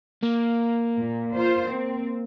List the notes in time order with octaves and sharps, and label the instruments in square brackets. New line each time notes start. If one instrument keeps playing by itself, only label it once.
[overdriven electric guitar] A#3
[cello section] A#2
F4 C5
C4